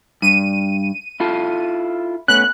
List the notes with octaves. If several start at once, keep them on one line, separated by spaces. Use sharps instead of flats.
G2 D#7
E4 F4 A4
A3 B3 C#4 F#6